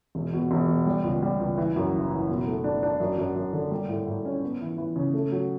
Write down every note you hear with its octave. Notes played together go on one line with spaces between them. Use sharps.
E1
B2
E1
B2
G3
C#2
G3
C#2
E3
F#2
F#1
E3
B2
A3
D4
D4
F#2
F#2
F#2
D3
G3
A2
A2
C#4
B3
E3
E3
C#3
A3
F#3